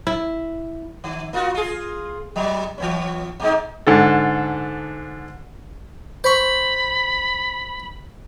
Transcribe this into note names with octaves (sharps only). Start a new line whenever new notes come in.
E4
D#3
A#3 F4 F#4
F4 G#4
F#3 G3
E3 B3 C#4
B2 G#3 D#4
G#2 D3 A4
C5 B5 C#6